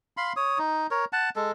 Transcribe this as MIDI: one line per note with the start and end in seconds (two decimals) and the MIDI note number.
0.17 0.33 77
0.17 0.33 83
0.17 0.33 84
0.36 0.58 73
0.36 0.58 87
0.58 0.87 63
0.91 1.05 70
0.91 1.05 73
1.13 1.30 78
1.13 1.30 81
1.36 1.52 56
1.36 1.52 69